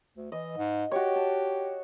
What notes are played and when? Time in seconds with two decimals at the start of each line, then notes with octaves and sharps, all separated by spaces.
0.17 D2
0.32 E3 D#5
0.57 G#2
0.91 F#4 G4 C#5
1.15 A5